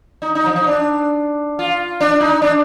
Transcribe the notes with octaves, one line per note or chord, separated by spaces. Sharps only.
D#4
D#4
F3
D#4
D4
F4
D4
D#4
D4